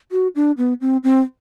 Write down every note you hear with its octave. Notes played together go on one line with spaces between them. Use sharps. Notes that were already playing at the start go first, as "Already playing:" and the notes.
F#4
D4
B3
C4
C4